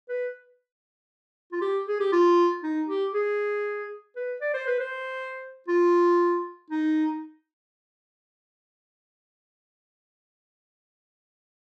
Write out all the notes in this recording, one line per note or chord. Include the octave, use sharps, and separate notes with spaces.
B4
F4
G4
G#4
G4
F4
D#4
G4
G#4
B4
D5
C5
B4
C5
F4
D#4